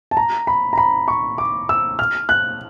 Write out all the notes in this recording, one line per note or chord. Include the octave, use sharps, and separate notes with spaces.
A5
A#5
B5
A#5
B5
C#6
D6
E6
F6
F#6